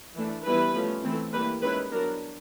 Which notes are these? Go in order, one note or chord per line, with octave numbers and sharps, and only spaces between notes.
E3 A3 D4
E3 G3 B3 E4 B4
F3 A3 C#4
E3 A3 C4 E4
E3 G3 A#3 B4
D#3 G#3 C#4 E4 B4
F#3 B3 D4 A#4